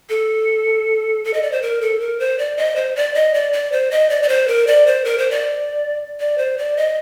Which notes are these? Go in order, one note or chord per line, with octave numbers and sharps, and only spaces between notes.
A4
A4
D#5
D5
C5
A#4
A4
A#4
C5
D5
D#5
C5
D5
D#5
D5
D5
C5
D#5
D5
D5
C5
A#4
D5
C5
A#4
C5
D5
D5
C5
D5
D#5